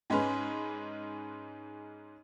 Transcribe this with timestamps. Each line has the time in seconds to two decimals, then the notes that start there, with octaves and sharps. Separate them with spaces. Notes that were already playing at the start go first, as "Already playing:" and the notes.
0.10 G#2 G#3 C#4 B4